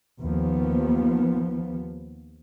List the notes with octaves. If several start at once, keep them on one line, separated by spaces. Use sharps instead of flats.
D#2 F3 B3